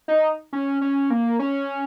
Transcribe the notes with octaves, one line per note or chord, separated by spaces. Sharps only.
D#4
C#4
C#4
A#3
C#4